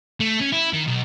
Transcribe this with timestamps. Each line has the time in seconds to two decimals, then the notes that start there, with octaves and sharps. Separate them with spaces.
0.20 A3
0.41 C#4
0.52 E4
0.73 D#3
0.87 B1